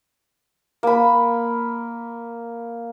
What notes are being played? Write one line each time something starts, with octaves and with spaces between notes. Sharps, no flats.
A#3 B5